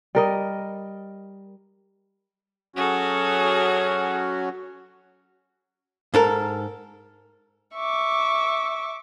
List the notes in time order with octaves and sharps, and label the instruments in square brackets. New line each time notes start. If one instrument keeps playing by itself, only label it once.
[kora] G3 A#4 D#5
[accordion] F#3 C#4 F#4 [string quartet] G#4 A4
[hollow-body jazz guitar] G#2 A4 A#4
[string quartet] E5 C#6 D6